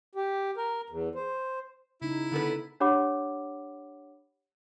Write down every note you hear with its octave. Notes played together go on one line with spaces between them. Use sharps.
G4
A#4
E2
C5
C#3 D#4 E4
D3 B3 A4 B4
D4 G4 C#5 F#5 B5 D6